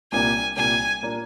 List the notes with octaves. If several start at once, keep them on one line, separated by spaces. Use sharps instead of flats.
C2 A#2 G3 A#3 D4 G#5
C2 A#2 G3 A#3 D4 G#5
A#2 G3 A#3 D4